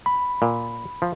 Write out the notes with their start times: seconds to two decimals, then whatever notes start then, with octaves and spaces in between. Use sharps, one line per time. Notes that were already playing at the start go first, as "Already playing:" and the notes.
0.06 B5
0.42 A#2
1.02 F3